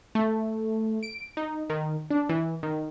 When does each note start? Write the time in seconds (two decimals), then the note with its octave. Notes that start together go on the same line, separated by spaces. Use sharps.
0.15 A3
1.03 D7
1.37 D#4
1.70 D#3
2.10 D4
2.29 E3
2.63 D#3